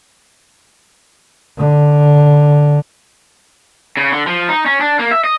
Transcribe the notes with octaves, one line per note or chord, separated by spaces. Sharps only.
D3
C#3
D3
F3
D#4
C#4
D4
A#3
E5
D#5